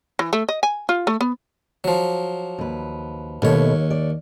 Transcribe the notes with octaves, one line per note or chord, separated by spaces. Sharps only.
E3
A3
D#5
G#5
F4
A3
B3
F3 F#3
D#2 B4
D#2 B2 A3 C#5
D5